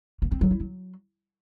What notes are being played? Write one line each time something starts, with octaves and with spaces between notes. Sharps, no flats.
A#3
C4
F#3
E4
F#3